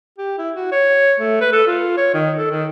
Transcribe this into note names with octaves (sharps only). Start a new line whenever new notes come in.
G4
E4
F#4
C#5
A3
B4
A4
F4
C#5
D#3
A4
D#3